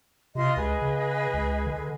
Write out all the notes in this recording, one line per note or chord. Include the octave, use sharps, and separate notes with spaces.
C3 F4 D#5 C6
C#2 G#4 B4 D#5
C#3
C#2
D3